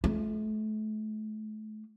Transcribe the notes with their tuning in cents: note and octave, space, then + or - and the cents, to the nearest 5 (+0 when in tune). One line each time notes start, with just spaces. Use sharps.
A3 -35 F4 +0